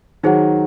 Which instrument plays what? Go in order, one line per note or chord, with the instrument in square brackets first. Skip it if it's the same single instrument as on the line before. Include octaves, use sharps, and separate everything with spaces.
[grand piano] D#3 F#3 [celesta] D#4 G#4 C5 F#5